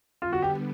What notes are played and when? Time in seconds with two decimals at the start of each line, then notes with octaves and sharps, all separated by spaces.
0.22 D3 G3 B3 F4
0.33 F#4
0.42 G4